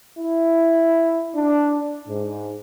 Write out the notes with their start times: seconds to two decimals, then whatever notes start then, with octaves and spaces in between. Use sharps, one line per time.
0.19 E4
1.36 D4
2.09 G#2